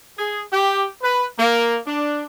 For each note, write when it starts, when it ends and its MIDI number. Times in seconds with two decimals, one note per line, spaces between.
0.19 0.41 68
0.53 0.86 67
1.02 1.26 71
1.38 1.77 58
1.87 2.25 62